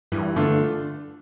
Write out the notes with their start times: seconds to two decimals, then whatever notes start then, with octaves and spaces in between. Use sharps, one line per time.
0.12 G2 E3
0.36 D3 A3 D4 F4 A4